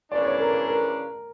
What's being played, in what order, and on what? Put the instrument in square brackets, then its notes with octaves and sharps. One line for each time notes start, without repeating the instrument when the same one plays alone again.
[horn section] C#3 E3 A#3 D4 [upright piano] D5
[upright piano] C#5
A#4
A#4